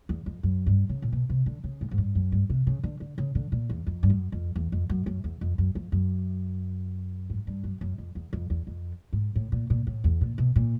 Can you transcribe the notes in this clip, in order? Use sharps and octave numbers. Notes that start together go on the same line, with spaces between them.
E2
F2
F#2
G2
C#3
A#2
B2
C3
D3
C#3
G#2
G#2
G2
F#2
G2
C3
C#3
D3
D3
C#3
D3
A#2
E2
F2
G2
F#2
F2
E2
F2
F#2
F#2
E2
F2
F#2
F2
F#2
G#2
G2
F#2
F#2
F2
E2
F2
E2
F2
G#2
A2
A#2
A#2
A2
E2
A#2
B2
A#2